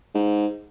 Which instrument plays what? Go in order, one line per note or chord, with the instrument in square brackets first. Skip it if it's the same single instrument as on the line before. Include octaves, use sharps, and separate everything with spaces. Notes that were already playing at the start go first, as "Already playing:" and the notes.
[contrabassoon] G#2